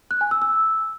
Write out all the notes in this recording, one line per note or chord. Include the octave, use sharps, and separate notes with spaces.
F#6
G#5
E6
E6